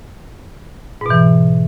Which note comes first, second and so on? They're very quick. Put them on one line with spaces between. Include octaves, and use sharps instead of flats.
G#2 B2 E3